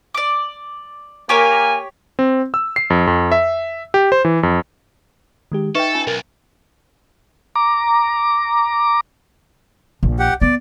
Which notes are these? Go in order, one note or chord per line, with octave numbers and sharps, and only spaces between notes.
D5 D6
A#3 G4 C#5 G#5
C4
E6
C7
F2
F2
E5
G4
C5
E3
F2
D#3 G#3 G4
D#4 A4 B4 E5 G5 C#6
C#4 F4 G#5
B1 A#4
A#5 D6
A#1
G4 F#5
B3 D5